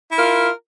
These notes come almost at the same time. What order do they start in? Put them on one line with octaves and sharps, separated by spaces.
E4 A#4 F4